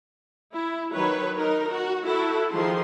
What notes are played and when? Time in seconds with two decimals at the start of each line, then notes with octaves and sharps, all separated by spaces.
0.53 E4
0.93 D#3 F#3 B4 C#5
1.37 D#4 A#4
1.68 F#4
2.05 E4 F#4 A4
2.50 D#3 F3 G#4 C6